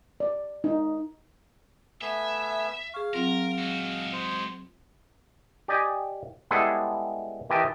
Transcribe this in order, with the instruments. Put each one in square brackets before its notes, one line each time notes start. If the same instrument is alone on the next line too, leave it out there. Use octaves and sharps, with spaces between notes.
[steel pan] D5
D#4
[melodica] A3 B3 G#5 [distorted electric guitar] E5
[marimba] G#4 C#6 [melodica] F5
[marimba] F#3 C4 F4 [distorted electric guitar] A#4
[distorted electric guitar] G#3 F#4
[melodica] C5
[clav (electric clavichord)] G4 D5 D#5 G5 G#5
G3 G#3 B3 E4 G#4 A4
D#3 E3 G4 D#5 G5 A5